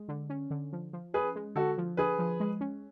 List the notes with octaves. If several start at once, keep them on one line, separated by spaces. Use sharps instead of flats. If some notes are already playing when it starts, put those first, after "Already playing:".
Already playing: G#3
D3
C#4
D3
F3
F3
C#4 G#4 B4
G#3
D3 F#4 A4
F3
D3 G#4 B4
F3
G#3
C#4